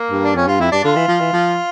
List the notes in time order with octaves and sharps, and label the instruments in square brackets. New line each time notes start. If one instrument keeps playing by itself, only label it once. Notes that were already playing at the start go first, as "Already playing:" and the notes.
Already playing: [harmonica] A#3
[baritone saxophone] G2
[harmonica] D4
[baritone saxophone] F2 [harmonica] C#4
[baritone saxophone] G2 [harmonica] F4
[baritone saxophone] F2 [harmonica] E4
[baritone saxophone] G2 [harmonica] D4
[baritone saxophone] D3 [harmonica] F4
[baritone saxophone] E3
F3
E3
F3